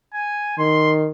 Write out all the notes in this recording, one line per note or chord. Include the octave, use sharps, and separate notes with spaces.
G#5
D#3 C6